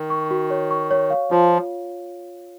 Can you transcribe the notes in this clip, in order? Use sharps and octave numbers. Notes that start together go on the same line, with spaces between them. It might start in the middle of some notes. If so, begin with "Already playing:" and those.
Already playing: D#3
C#6
F#4
C#5
C#6
C#5
F5
F3 F4